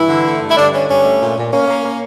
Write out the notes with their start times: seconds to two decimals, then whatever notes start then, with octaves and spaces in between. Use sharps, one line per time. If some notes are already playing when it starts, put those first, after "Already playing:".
Already playing: G2 E3 E4
0.08 D3
0.25 A3
0.41 G2
0.49 E4
0.55 G2 D3 D4
0.72 D3 C#4
0.88 G2 C#4
1.04 A3
1.20 A#2
1.36 A#2
1.52 A#3 C#4
1.68 A#3
1.84 A#3